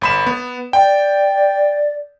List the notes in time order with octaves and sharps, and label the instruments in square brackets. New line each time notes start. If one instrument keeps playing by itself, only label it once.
[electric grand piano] G1 B5 E7
B3
[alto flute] D5 [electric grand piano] G5